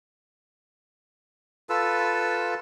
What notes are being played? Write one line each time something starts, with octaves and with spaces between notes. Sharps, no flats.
F4 A4 B4 E6